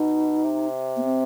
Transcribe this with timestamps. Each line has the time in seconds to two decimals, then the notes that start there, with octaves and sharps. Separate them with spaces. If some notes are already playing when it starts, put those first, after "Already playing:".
Already playing: B2 D#4
0.44 C3
0.96 B3
1.04 C4